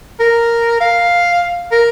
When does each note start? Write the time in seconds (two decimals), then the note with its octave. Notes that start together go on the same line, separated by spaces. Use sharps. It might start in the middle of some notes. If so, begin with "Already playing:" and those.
0.20 A#4
0.81 F5
1.72 A#4